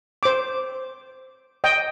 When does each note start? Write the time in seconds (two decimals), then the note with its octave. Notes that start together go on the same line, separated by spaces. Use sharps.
0.23 C5 D6
1.64 D#5 G5